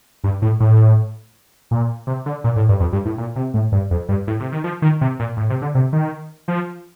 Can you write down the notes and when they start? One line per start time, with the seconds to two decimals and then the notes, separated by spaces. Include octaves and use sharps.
0.24 G2
0.42 A2
0.60 A2
1.71 A#2
2.07 C3
2.26 D3
2.44 A#2
2.56 A2
2.69 G2
2.80 F2
2.93 G2
3.05 A2
3.18 A#2
3.36 C3
3.54 A2
3.72 G2
3.91 F2
4.09 G2
4.27 A2
4.40 C3
4.52 D#3
4.64 F3
4.82 D#3
5.01 C3
5.19 A#2
5.37 A2
5.50 C3
5.62 D3
5.75 C3
5.93 D#3
6.48 F3